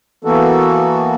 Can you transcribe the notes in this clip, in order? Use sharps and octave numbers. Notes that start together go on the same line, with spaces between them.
E3 A#3 B3 F#4 A4